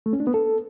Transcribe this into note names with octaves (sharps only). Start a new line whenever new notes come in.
A3
C#4
D4
B3
A4